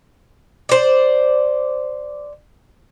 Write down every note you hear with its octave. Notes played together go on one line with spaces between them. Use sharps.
C5 D5